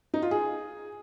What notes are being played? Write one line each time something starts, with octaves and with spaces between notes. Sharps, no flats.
D#4
F4
G#4